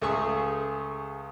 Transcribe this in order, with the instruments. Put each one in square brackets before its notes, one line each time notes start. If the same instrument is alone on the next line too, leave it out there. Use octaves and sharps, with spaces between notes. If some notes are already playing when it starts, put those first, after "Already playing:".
[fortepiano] C#2 A3 G#4 E5 C#6